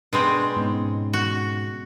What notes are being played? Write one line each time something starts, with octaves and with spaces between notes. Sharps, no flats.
B2 G#3 C4 D4 B4
G#2 B3 C#4
F#4